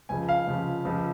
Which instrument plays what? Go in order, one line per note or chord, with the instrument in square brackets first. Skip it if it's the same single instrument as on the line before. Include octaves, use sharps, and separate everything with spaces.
[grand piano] C#2 C#3 F3 G#5
F5
C#2 C#3 F3
C#2 C#3 F3